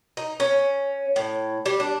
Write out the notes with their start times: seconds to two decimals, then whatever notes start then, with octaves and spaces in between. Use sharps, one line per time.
0.17 D#4
0.40 C#4
1.16 A2
1.66 G3
1.80 D4